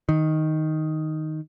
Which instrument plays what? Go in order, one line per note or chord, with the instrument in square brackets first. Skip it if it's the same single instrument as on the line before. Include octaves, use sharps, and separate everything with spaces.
[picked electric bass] D#3